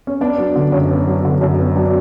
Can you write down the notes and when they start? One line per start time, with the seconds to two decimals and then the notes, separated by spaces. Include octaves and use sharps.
0.07 C#4
0.21 B3 D4
0.38 F#3
0.55 D3
0.72 F#2 C#4
0.90 B3
1.07 F#3
1.25 D3
1.41 F#2
1.59 B3
1.76 F#3 D4